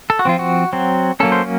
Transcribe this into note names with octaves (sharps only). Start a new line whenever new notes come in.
A4
F#4
F3 C4 F4
F#4
F#3 C4
F#3 A#3 C#4 A4
C5